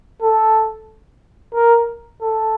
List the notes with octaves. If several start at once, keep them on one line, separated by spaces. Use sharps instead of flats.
A4
A#4
A4